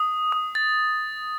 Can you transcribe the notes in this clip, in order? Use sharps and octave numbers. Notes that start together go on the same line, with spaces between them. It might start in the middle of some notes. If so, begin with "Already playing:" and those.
Already playing: D#6
D#6
A6